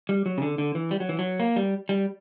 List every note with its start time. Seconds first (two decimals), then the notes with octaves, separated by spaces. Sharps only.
0.09 G3
0.26 F#3
0.38 C#3
0.42 D3
0.58 D3
0.75 E3
0.91 G3
1.00 F#3
1.09 E3
1.19 F#3
1.40 A#3
1.56 G3
1.89 G3